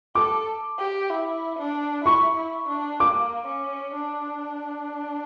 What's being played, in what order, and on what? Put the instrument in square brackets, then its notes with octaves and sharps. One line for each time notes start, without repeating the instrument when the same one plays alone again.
[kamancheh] A4 [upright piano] D6
[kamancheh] G4
E4
D4
[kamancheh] E4 [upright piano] C#6
[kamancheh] E4
D4
[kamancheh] A#3 [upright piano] D6
[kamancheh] C#4
D4